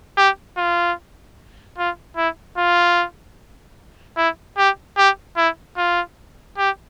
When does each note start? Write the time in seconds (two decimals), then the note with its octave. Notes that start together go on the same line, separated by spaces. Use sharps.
0.18 G4
0.57 F4
1.78 F4
2.17 E4
2.58 F4
4.17 E4
4.58 G4
4.98 G4
5.37 E4
5.77 F4
6.58 G4